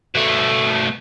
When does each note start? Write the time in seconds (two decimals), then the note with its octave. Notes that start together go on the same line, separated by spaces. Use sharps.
0.15 B2 A3